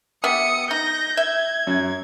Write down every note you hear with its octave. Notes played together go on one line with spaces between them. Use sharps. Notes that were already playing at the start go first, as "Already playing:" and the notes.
B3 G4 E5 D#6 C#7
D#4 G6 A#6
E5 G#6
F#2